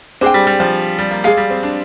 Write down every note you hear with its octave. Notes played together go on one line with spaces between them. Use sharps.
C4 D4 G#4 C5 G5
G3
G3
F3
G3
A#3
G#3 G#4 D5 F5
G3
C4
D4